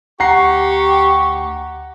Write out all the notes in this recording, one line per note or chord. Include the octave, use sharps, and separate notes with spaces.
D2 G4 F#5 A#5 C#6 C7